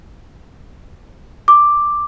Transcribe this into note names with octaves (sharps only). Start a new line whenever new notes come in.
D6